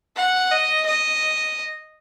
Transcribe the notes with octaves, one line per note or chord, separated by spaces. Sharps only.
F#5
D#5
D#5